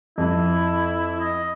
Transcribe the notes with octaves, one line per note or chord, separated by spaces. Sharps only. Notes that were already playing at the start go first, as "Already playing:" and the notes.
F2 E4
D#5